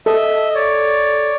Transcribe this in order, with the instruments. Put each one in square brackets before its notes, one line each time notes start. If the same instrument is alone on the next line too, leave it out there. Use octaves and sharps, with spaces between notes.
[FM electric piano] A4 [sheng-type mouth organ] D#5 E5
[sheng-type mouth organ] C#5 D5